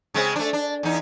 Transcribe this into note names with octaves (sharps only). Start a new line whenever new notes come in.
C#3 G#3 C4
A3 D4
D4
E2 D#4